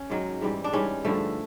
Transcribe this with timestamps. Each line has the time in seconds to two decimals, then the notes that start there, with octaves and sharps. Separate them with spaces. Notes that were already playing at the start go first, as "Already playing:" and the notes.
Already playing: C#4
0.10 G#2 D#3 F#3
0.41 G#2 E3 G3
0.64 D4
0.73 G#2 E3 G3 C#4
1.05 G2 D3 F3 A3